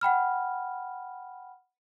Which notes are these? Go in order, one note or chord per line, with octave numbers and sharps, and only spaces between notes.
F#5 G5 B5 F6